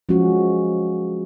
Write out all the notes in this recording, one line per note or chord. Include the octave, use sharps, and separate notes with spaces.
F3 G#3 C#4 F#4